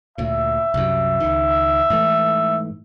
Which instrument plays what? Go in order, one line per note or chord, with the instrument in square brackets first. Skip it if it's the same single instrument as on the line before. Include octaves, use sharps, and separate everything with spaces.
[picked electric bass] D2 A#2 [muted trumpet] E5
[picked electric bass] C2 F#2
C#2 D#3
G#2 E3 A3